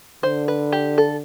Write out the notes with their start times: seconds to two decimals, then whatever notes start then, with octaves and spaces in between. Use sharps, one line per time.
0.23 D3 C5
0.48 B4
0.73 G4
0.98 A4